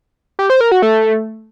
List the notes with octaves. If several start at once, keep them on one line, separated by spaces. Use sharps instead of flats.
G4
C5
A#4
F#4
A3